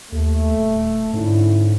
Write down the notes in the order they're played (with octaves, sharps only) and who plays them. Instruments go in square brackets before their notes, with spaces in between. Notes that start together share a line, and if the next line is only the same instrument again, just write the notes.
[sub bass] D#2 [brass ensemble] A3
[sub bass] D#1
[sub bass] G#2 [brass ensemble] D3 C#4 E4